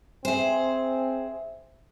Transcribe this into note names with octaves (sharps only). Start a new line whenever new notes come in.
C4 G#4 C5 E5 G#5